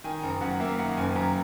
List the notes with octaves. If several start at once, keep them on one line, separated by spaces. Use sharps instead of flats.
D#3 G#5
F#1 A#5
F#2 F#5
A#3 E5
D#3 F#5
F#1 G#5
F#2 A#5